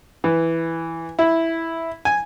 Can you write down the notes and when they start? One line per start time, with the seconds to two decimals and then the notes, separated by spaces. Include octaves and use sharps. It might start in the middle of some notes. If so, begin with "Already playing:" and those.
0.24 E3
1.19 E4
2.05 G#5